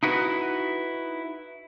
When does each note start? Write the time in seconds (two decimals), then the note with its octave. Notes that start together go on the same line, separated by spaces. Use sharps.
0.03 D#4 E4 F#4 B4